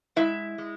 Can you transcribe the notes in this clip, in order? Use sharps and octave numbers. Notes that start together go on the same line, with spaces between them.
G#3 E4 E5
G#3